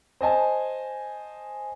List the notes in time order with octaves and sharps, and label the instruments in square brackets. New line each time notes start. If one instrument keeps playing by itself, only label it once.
[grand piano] C5 D#5 G#5 A5